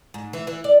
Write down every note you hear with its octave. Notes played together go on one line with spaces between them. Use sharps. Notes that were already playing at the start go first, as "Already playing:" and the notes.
G#2
E3
E3
D5